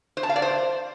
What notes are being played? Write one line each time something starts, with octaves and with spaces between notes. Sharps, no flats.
C5
A5
F5
D5
C5